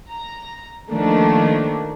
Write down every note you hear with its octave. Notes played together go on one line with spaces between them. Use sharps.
A#5
D#3 F3 A3 A#3 D4